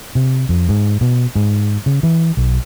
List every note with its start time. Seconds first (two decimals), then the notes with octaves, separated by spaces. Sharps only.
0.15 C3
0.49 F2
0.69 G#2
1.01 B2
1.36 G#2
1.86 C#3
2.03 E3
2.37 B1